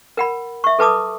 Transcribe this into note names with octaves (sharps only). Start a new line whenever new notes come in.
A#4 F#5 B5
E5 C#6
A4 B4 A5 D6 D#6